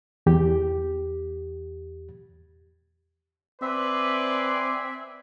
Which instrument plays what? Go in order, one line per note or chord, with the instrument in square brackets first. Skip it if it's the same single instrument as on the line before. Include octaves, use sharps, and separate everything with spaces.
[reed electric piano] E2 G4
[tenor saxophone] C4 [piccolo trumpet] B4 [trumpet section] D5 G#5 C6 [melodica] E5